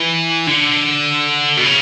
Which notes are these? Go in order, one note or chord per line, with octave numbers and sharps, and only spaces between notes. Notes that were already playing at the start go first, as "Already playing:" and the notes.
Already playing: E3
D3
B2
C#3